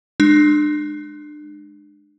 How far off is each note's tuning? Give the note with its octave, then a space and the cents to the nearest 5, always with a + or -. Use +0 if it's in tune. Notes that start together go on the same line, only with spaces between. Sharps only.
G#3 +0 D4 +30